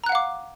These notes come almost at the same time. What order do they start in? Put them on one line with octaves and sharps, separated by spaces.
A#5 F#6 F#5 F5 D6